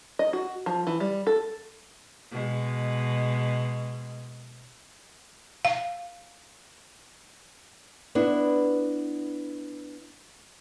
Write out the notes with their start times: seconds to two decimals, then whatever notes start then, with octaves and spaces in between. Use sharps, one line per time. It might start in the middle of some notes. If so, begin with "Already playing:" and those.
0.19 D#5
0.33 F#4
0.66 F3
0.87 E3
1.00 G3
1.27 A4
2.31 B2 G#3
5.65 F5
8.15 B3 D4 E4